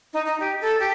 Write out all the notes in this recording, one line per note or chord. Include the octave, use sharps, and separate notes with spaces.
D#4
D#4
G4
A4
G4